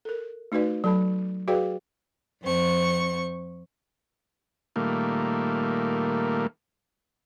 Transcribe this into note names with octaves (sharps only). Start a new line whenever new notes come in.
A4 A#4
A3 D#4 F#4 B4 D5
F#3 A4 A5 B5
F#4 G#4 B4 D5 F5 G5
F2 C4 C#6
A#2 D#3 G3 A3 A#3